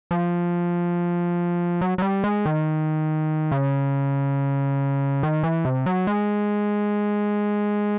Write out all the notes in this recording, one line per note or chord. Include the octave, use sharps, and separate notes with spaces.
F3
F#3
F#3
G3
G#3
D#3
C#3
D#3
E3
C3
F#3
G#3